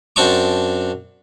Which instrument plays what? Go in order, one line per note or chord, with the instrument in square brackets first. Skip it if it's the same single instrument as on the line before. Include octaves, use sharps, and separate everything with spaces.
[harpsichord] F#2 C4 D4 A5 C#6 D6